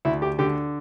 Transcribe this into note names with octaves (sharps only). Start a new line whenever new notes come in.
D2 E4
G4
D3 G4